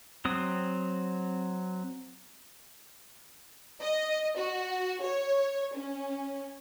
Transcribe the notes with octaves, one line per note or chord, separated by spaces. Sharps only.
F#3 C4 D#6
D#5
F#4
C#5
C#4